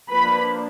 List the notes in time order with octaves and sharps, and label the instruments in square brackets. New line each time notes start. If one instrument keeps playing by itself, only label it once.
[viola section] F3 A#3 D4 B4 B5